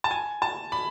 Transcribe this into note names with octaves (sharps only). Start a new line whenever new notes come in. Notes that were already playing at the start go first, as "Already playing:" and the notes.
A5
G#5
A5
B5